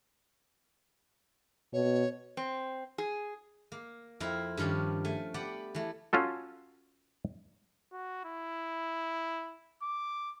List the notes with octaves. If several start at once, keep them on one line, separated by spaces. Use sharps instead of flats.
B2 C#5
C4
G#4
A#3
F2 C4 E4 F5 A#5
G2 D#3 F3 C#4 D4
A3 G#5
B3 G4 D5 F#5
E3 A3
C#4 F4 F#4 A4
F#4
E4
D6